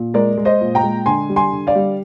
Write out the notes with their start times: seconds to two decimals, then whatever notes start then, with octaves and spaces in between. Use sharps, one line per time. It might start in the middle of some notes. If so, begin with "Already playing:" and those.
Already playing: A#2
0.14 G#3 A#4 D5
0.38 G#3
0.45 C5 D#5
0.61 A#2
0.75 G5 A#5
0.83 G#3
1.06 D3 G#5 C6
1.29 G3
1.36 G#5 C6
1.51 D3
1.67 D5 F5
1.75 G3